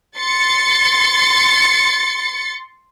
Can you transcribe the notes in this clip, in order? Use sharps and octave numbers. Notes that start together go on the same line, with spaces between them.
C6 A6 C#7